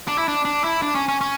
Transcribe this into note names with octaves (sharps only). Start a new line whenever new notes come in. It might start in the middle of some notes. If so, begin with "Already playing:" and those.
D4
E4
D4
D4
E4
D4
C#4
C#4
C#4